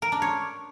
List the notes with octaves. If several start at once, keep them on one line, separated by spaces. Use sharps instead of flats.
A#4
D4
C#5